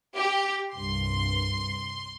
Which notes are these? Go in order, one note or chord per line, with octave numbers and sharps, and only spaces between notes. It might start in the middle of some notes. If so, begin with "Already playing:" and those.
G4
C2 G2 C6